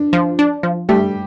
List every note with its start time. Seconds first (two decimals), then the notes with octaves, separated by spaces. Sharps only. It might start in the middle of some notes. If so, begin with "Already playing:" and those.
Already playing: D4
0.13 F3
0.39 D4
0.63 F3
0.89 G3 A3 G4